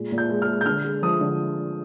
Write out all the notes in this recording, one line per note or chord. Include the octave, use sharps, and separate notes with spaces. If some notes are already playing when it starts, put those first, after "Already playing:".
Already playing: A#2 G#3
A#2
G6
G#3
F6
G#3
G6
D3 F6
G#3
F3 D#6
D3